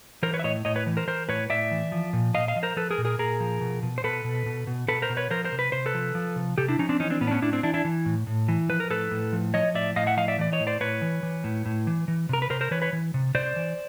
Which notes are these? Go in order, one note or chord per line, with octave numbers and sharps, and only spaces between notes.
E3 A#4 C5
B4 C#5
E5
A2 C#5 D#5
A2 C#5 D#5
B4 C#5
E3
A#4 C5
E3 A#4 C5
A2 B4 C#5
A2 D5 E5
E3
F3
A#2
A#2 D#5 F5
D#5 F5
F3
A#4 C5
F3 A4 B4
G#4 A#4
A#2
G#4 A#4
A#2 G#4 A#4
F3
B2
B2
C5
B2 A4 B4
B2
B2
B2
B2 A4 B4
A#4 C5
B2
B4 C#5
F3 A#4 C5
A#4 C5
C3
B4
C3 C5
A4 B4
F3
F3
C3
C3 G4 A4
D4 E4
F3 C#4 D#4
C4 D4
E3 C#4 D#4
C4 D4
A2 B3 C#4
D4
B3 C#4
A2 D4 E4
C4 D4
E3 D4 E4
D4 E4
E3
A2
A2
E3
F3 B4
A#4
A2 A4 B4
A2
F3
F3 C#5 D#5
A2 D5 E5
A2 D#5 F5
E5 F#5
F3 D#5 F5
D5 E5
E3 D5
C#5 D#5
A2
C5 D5
A2 B4 C#5
E3
E3
A2
A2
E3
E3
C3 A#4
B4
C3 A#4 C5
A#4 C5
E3 B4 C#5
B4 C#5
E3
C3
C3 C5 D5
E3